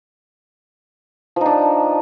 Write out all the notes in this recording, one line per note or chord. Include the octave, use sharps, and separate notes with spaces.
F3 D4 D#4